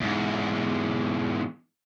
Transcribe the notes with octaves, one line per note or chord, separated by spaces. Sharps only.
E2 G#2